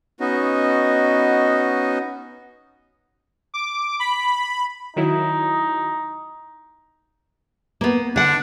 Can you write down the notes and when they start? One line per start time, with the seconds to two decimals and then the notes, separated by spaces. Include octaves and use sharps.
0.20 B3 C#4 D#4 F#4 D#5
3.54 D6
4.00 B5
4.96 D#3 F#3 D#4 E4
7.81 A#3 B3
8.16 D3 D4 F#5